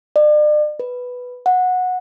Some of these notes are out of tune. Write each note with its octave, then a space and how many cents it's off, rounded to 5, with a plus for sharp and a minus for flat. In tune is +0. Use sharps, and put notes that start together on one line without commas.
D5 +40
B4 +0
F#5 -15